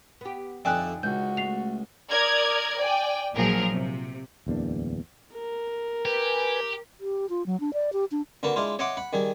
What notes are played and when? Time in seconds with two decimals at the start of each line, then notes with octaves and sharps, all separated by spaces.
0.21 B3 G4
0.65 F2 D3 D#4 D5 E5 G5 G#5 F#6
1.03 C#2 F#4 G6
1.37 A3 C7 F7
2.11 A#4 D5 D#6 G#6
2.79 D5 G5 G#5
3.36 A#1 A#2 F3 F#3 G#4 A#4
3.73 C3
4.46 D1 E2 A#3 D4
5.34 A#4
6.05 G4 B4 G#5
7.00 G4
7.29 F4
7.46 F#3
7.60 D4
7.73 D5
7.93 G4
8.11 D4
8.43 D3 A#3 F#4 B4 A5
8.56 G#3 D4 E4 F4
8.79 C#5 D#5 E5 F#5 C6 D6
8.97 F#5 B5
9.13 D#3 G3 G#4